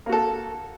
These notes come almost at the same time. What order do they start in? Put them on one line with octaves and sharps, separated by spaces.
A#3 F#4 A4